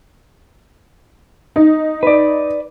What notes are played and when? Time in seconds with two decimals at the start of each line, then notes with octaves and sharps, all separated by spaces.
1.56 D#4
2.03 B4 D5